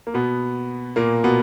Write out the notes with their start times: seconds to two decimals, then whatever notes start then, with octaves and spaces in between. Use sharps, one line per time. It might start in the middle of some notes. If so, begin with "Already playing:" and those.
0.07 A#3
0.14 B2 B3
0.96 A#2 A#3
1.24 B2 B3